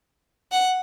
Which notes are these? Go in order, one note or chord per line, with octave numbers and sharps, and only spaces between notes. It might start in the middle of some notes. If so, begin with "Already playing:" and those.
F#5